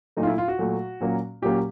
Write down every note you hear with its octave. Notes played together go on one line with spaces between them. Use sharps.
A#2 F#3 A3 D#4
F4
E4
F4
F#4
A#2 F#3 A3
A#2 F#3 A#3 C#4
A#2 F#3 A#3 C#4 G4